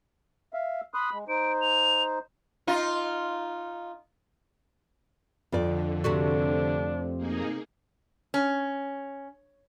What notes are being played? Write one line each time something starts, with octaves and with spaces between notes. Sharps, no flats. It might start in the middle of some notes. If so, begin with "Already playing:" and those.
E5 F5
B5 C6 D#6 F#6
G#3
D#4 C5 D7
F7
D#4 F4
F2 D3 F4 D5
C3 A3 D4 F#4
A#3 D#4 G#4
C#4